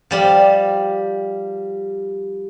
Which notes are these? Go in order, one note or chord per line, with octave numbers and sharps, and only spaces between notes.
F3 G3 G4